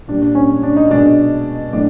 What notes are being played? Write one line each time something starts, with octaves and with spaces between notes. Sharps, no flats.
A#2 G3 D4
D4
C#4
D4
D#4
B2 G#3 D4
A2 D4